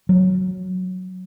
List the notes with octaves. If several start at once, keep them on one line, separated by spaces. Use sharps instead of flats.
F#3